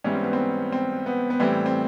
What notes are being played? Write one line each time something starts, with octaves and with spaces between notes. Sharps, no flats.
G#2 E3 G3 C#4
C4
B3
C4
C4
B3
B3
A2 E3 G3 C4
C4